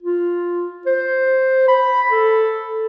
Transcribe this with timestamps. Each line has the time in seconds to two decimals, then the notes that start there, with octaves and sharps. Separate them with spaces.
0.03 F4
0.86 C5
1.68 B5
2.10 A4